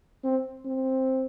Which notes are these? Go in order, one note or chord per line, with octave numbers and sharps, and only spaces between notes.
C4
C4